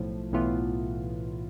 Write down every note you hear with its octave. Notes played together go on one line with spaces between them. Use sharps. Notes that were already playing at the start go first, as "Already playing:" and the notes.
Already playing: B1 A2 F3
B1 A2 E3 B3 F4